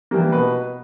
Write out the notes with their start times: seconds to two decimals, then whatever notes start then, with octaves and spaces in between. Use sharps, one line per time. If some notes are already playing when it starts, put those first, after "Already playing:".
0.11 E3 G3 A#3
0.32 B2 B4